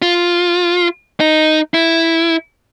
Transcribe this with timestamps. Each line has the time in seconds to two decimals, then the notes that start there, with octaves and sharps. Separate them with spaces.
0.02 F4
1.20 D#4
1.74 E4